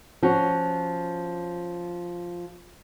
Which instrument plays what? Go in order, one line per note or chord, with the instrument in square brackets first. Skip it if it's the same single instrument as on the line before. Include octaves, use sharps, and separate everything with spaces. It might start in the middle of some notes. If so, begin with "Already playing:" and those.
[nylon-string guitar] F3 C#4 F#4